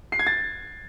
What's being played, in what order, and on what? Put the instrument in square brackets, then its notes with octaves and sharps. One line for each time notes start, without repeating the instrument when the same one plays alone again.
[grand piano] C7
G#6
A6